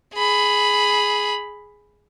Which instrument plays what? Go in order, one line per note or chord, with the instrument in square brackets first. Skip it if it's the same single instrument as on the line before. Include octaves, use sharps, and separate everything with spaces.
[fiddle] G#4 B5